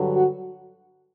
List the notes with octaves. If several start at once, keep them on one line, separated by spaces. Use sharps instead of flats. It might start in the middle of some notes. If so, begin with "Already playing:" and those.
Already playing: G2 D3 F#3
F#4